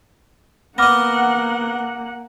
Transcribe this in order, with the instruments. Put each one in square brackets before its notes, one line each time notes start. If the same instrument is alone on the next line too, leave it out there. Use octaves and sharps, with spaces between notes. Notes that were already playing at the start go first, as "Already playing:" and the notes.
[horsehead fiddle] A#3 F#5 [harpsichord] B3 D#5 [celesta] D6 F6 A#6